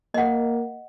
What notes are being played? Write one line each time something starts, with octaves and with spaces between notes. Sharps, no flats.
A#3 D#5 F#5